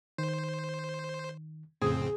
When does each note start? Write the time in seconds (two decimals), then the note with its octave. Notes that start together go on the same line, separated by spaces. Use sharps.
0.18 D#3 C5
1.82 C2 F2 A2 C#3 C4 G#4